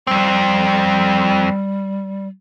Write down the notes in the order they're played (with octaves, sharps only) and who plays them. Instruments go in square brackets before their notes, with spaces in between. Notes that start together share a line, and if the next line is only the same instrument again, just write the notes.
[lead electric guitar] F2 C4 [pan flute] G3